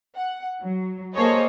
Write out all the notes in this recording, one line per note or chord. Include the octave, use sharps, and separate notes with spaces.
F#5
F#3
A#3 G#4 A4 C5 C#5 D#5